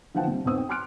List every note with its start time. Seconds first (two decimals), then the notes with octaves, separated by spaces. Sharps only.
0.15 D3 E3 F3 F#5 G5 A5
0.27 C3 G3
0.45 B1 F2 B3 D#6 E6
0.58 G5
0.69 G#5 C6 D6 F6 F#6 D7